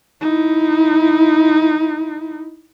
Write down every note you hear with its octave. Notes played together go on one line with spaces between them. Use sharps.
D#4 E4